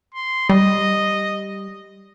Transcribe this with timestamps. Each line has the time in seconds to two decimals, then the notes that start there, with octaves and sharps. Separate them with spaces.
0.14 C6
0.49 G3 D#5